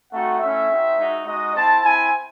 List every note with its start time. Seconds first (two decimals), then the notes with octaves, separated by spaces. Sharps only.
0.11 A3 C4 D#4 F#4 F#5
0.40 A3 C#4 E4 E5
0.69 C4 D#4 F#4
0.98 G#3 D#4 F#4
1.26 G#3 D#4 F#4 D#5
1.55 C4 E4 A5
1.84 C4 E4 G#5